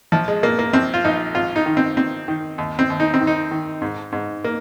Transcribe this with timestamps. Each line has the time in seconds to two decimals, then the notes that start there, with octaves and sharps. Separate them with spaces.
0.12 A#1 F3
0.28 G#3
0.43 A#2 A#3
0.59 A#3
0.73 A#1 C4
0.94 F4
1.04 A#1 D#4
1.35 G#1 F4
1.56 D#4
1.66 D#3
1.77 C4
1.97 D#3 C4
2.28 D#3
2.58 D#2
2.79 C4
2.90 D#2
3.00 D#4
3.14 C4
3.21 D#3
3.27 D#4
3.51 D#3
3.82 G#2
4.12 G#2
4.44 A#3